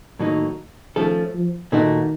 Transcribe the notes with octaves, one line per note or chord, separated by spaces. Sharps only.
A2 D#3 F#3 A#3 D#4
D#3 F3 A3 C#4 A4
F3
A#2 D#3 A3 D#4 F#4